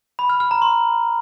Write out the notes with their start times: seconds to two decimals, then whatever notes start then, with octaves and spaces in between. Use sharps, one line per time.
0.19 B5
0.30 F6
0.40 F6
0.51 A#5
0.62 C6